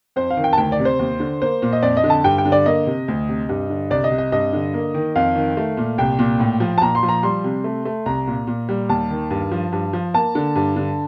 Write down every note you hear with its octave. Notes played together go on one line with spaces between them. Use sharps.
F2 C5
F5
D#3
G5
A5
D2 G5
D5
C3
C5
D#2
D3
A#3 C5
A#2
D#5
F2 D5
D#5
D3
A5
G2 G5
G5
D3
D5
A#3 D#5
C3
D2
C3
G2
D3
C2 D5
D#5
C3
D#5
G2 D#5
D3
A#3
D#3
F2 F5
D#3
A3
A#2
C2 G5
A#2
A2
F3
A5
A#2 A#5
C6
F3
A#5
G3 C6
C3
A3
A3
C2 A#5
A#2
A#2
G3
D#2 A5
D#3
G2
F3
G2
F3
A#3 A5
D3
G2
D3